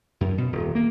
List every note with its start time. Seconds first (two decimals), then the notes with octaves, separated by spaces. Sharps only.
0.21 F#2
0.38 B2
0.52 D#1
0.75 A#3